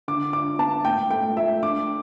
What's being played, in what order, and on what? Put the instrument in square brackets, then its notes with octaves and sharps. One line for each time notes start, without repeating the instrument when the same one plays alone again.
[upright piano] D3 D6
D4 D6
B3 A5
A2 G5
A3 G5
A3 E5
D4 D6